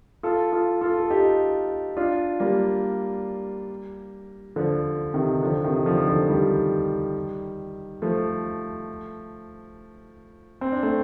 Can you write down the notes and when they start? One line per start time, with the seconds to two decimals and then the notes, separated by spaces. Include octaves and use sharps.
0.23 F4 A4
0.52 F4 A4
0.81 F4 A4
0.99 A4
1.10 D#4 G4
1.97 D4 F4
2.40 G3 A#3
4.56 D3 F3
5.14 C3 D#3
5.43 D3 F3
5.64 C3 D#3
5.86 D3 F3
6.08 D3 F3
6.29 D#3 G3
8.02 F3 A3
10.61 C4
10.72 D4
10.83 A3 C4